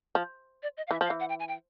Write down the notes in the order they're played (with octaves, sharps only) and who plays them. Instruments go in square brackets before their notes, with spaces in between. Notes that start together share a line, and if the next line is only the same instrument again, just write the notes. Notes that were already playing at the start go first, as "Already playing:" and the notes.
[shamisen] F3
[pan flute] D5
D#5
F5
[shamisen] E3 [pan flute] E5
[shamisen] F3
[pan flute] F5
[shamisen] E3
[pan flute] F#5
G5
G#5
G5